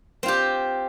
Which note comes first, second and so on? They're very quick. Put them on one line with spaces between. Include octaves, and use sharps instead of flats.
C4 F4 G4